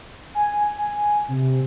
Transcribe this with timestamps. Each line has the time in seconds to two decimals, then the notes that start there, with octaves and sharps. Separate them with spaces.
0.35 G#5
0.78 G#5
1.28 C3